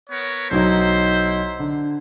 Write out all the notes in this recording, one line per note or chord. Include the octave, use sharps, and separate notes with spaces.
B3 A#4 C#5
B1 F#3 D#4 E4 C5
D3